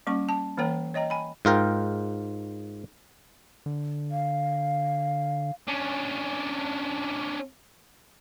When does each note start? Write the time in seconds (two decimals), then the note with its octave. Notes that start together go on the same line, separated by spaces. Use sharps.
0.07 G3 A#3 C#4 C#6
0.29 A5
0.57 E3 A#3 A#4 C#5 G5 A#5
0.94 C#5 D#5 G5 A#5
1.10 G#5 B5
1.45 G#2 F4 A#4 G5
3.66 D3
4.11 F5
5.67 C#4 D4